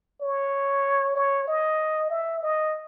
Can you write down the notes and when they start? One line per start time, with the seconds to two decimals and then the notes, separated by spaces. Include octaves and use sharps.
0.21 C#5
1.16 C#5
1.48 D#5
2.10 E5
2.43 D#5